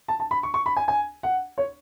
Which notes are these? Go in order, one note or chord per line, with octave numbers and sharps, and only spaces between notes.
A5
A5
B5
C#6
C#6
B5
G#5
G#5
F#5
C#5